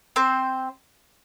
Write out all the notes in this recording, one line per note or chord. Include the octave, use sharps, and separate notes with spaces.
C4 C5